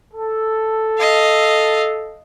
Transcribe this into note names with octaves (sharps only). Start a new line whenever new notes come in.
A4
D#5 F5